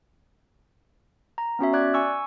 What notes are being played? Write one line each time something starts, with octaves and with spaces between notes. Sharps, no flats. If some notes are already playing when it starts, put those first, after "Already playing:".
A#5
B3 C#4 F#4 E5
D5 D6 F#6 G#6
G#5 C#6 E6